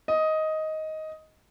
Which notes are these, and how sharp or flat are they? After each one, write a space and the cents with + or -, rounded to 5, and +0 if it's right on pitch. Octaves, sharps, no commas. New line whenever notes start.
D#5 +10